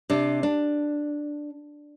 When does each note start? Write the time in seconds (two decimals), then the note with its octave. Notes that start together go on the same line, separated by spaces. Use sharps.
0.10 C3 D4
0.43 D4